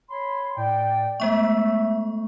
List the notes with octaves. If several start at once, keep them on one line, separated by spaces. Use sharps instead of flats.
C#5 B5 C6
A2 D5 G5
G#3 A3 B3 E5 C#6